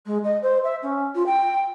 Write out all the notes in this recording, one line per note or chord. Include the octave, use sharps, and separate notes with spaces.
G#3
D#5
C5
E5
C#4
F4
G5